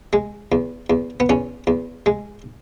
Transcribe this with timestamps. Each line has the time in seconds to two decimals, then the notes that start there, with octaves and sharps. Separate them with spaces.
0.13 G#3
0.52 E2
0.90 E2
1.20 B3
1.29 E2 C#4
1.67 E2
2.06 G#3